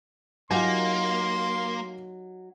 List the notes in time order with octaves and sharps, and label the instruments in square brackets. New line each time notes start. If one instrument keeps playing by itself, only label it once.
[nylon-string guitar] F#3 D#4 G4 [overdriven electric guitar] A#3 [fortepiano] F4 G#5 [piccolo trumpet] C6